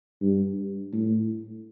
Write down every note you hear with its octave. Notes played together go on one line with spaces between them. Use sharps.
G2
A2